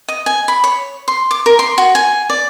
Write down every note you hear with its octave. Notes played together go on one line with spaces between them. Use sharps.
D#5
G#5
B5
C#5
C6
D6
A#4
C6
F#4
G#5
D5